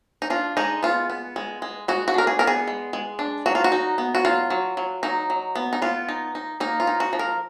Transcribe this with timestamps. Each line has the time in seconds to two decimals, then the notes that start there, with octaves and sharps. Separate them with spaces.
0.22 D#4
0.30 D4 F4
0.57 G#3 D#4
0.83 B3 F4
1.10 B3
1.36 G#3
1.62 G#3
1.88 G#3 F#4
2.08 F#4
2.14 D4 A#4
2.27 G#4
2.39 B3 A#4
2.47 G#4
2.67 G#3
2.93 G#3
3.19 D4
3.46 F#3 F#4
3.55 F4
3.64 F#4
3.72 D#4
3.98 B3
4.15 F#4
4.25 F#3 F4
4.50 F#3
4.77 F#3
5.03 F#3 D#4
5.30 F#3
5.55 B3
5.73 D#4
5.82 B3 F4
6.08 D#4
6.35 D#4
6.60 A#3 D#4
6.80 F4
6.87 D#4
7.00 F#4
7.13 F3
7.19 A#4